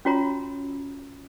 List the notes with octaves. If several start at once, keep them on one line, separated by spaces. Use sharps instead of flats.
C#4 F4 F#4 C#5 A#5 B5